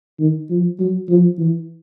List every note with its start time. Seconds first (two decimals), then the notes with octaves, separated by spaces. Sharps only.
0.19 D#3
0.50 F3
0.79 F#3
1.09 F3
1.38 E3